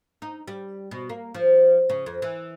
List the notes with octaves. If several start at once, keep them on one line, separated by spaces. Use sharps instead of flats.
D#4
G3
B2
A#3
F3
C#3
F2
E3